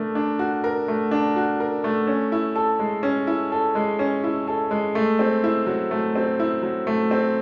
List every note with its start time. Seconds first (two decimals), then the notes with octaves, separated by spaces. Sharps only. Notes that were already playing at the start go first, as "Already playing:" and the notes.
Already playing: A3 D4 A#4
0.15 D4
0.39 F#4
0.64 A#4
0.88 A3
1.11 D4
1.36 F#4
1.60 A#4
1.84 A3
2.07 C#4
2.32 E4
2.55 A4
2.79 G#3
3.03 C#4
3.27 E4
3.52 A4
3.75 G#3
3.99 C#4
4.24 E4
4.47 A4
4.71 G#3
4.95 A3
5.19 C4
5.44 E4
5.67 F#3
5.91 A3
6.15 C4
6.39 E4
6.63 F#3
6.87 A3
7.11 C4